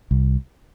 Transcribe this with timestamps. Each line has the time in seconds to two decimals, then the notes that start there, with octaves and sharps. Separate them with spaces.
0.11 C2